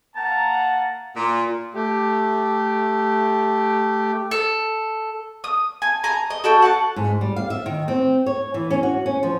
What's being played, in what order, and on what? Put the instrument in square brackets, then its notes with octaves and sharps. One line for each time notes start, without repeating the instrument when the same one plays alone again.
[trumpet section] A#3 F#5 A#5 [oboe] A5
[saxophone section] A#2
[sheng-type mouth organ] A3 G4
[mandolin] A4
D#6
G#5
G#5 A#5
D#5
F#4 A4 G5
F#5 A5
[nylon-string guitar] G#2
G3
F5
E5
D#3
C4
C#5
E3
C#4
F#4
C#4
F3